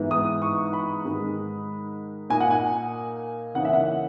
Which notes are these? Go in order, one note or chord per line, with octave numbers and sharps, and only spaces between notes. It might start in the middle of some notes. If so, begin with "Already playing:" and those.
Already playing: G#2 E3 G#3 B3
D#6
C#6
B5
G#2 D#3 G#3 D#4
A#2 A#3 D#4 G#5
F#5
G#5
C#3 E3 A#3 D#4 F#5
E5
F#5